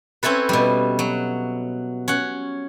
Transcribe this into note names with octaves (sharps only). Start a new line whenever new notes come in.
C4 C#4 E4 A4 B4
B2 G3
F#3
C#4 F#5